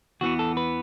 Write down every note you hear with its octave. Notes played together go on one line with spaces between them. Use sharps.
E2 E3 B3 F#4
A4
B4